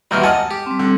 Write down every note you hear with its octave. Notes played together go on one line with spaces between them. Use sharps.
G#1 D#2 B2 E3 G3 F6
D#5 F#5 G#5 A5 F6
G4
G3 C4
D3